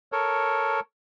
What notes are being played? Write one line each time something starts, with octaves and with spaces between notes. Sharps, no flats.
A4 A#4 C#5